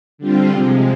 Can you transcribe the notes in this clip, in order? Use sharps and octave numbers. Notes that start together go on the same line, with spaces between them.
D3 G3 C4 F4
C3 F3 G#3